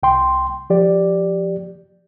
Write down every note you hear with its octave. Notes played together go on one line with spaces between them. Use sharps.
C2 G5 C6
F3 G4 D5